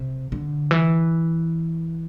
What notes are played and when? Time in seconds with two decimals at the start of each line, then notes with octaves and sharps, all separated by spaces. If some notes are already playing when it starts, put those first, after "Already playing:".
Already playing: C3
0.32 D3
0.71 E3